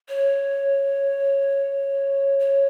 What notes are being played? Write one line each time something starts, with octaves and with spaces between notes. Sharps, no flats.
C#5
C#5